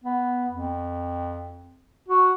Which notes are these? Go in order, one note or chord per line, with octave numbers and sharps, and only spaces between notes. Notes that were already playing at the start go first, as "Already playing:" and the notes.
B3
F2
F#4